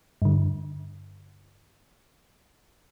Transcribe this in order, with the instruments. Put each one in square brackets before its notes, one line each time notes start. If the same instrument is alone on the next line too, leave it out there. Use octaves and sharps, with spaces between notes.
[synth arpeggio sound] G2 D3